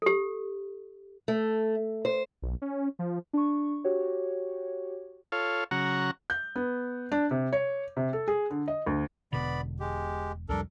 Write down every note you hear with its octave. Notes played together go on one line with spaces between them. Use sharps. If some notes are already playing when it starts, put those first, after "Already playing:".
G4 A4
A3
C5
B1
C#4
F3
D4 C#6
F#4 G4 C#5
F4 A4 C#5 F5
C#3 F#3 F#4 F#5 A#5 C#6
G6
B3
D4
C3
C#5
C3
A4
G#4
D3
D#5
D2
E1 B2 D3 B3 D5 B5
G#3 G4
C2 F2 G3 D4 A4 A#4